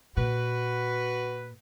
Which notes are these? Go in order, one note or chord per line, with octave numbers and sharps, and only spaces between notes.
A#2 F#4 B4